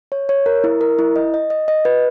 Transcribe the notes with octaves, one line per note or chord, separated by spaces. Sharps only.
C#5
C#5
A#4
E4
A#4
E4
D#5
D#5
D#5
D#5
B4